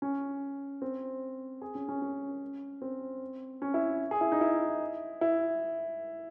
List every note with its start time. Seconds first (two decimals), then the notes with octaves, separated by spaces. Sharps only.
0.02 C#4
0.82 C4
1.62 G#4
1.75 C#4
1.89 C#4
2.02 C#4
2.82 C4
3.62 C#4
3.74 E4
4.11 G#4
4.21 E4
4.32 D#4
4.41 E4
5.21 E4